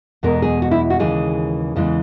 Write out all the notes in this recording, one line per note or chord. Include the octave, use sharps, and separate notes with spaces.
E2 B2 G#3 A#4
G#4
F#4
E4
F#4
D#2 C#3 E3 G#3 G#4
E2 C#3 E3 G#3